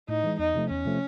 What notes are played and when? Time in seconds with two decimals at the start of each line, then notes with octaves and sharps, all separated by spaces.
0.09 A2 D#4
0.24 E3 G#3
0.39 E2 D#4
0.55 C3 F3 A3
0.69 E2 C#4
0.85 C3 F3 A3